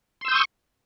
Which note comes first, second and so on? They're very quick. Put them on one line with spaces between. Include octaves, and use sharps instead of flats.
C6 E6 G6 D#6 C#6